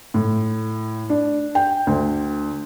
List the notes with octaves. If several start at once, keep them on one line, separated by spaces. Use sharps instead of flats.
A2
D4
G5
D2